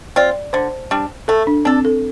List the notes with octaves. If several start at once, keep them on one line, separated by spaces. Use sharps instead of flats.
C4 F4 D5
D3 C5
G3 D4
A3 A4
D4
C4 D4 A4
A4